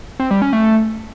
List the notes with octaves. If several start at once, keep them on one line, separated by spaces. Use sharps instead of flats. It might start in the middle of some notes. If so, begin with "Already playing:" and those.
C4
G3
C#4
A3